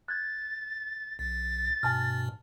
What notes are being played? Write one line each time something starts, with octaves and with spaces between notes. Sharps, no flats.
F#6 G#6 A6
B1 A6
G2 B2 G#5 A5 F6